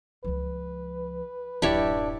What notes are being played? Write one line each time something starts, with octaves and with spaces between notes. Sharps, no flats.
C#2 F3 B4
D1 F#2 D4 E4 G4 C#5 D5